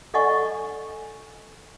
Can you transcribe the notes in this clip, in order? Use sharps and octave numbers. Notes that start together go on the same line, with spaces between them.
A4 D5 D#5 F#5 G#5 C#6